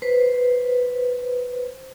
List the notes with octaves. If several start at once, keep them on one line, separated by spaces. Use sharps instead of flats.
B4 C5